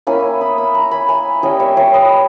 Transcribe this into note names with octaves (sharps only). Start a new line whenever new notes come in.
A#3 C#4 E4 G#5 B5
B5 D#6
B5 D#6
A#5 C#6
G#5 B5
E5 G#5
G3 C#4 E4 D#5 G5
C#5 E5
C#5 E5
B4 D#5